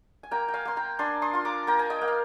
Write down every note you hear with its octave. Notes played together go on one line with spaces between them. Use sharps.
G#5
A#3 G5 A#5
G5
F5 G#5
A#3 C6
G5 A#5
D4 G#5 C6
C6 D#6
F4 C6
A#5 D6
A#3 G5 A#5
G#5
D#5 G5
A#3
F5